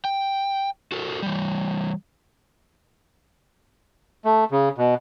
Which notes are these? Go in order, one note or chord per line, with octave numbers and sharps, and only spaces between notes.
G5
F#4 A4 A#4
E3 G3
A3
C#3
B2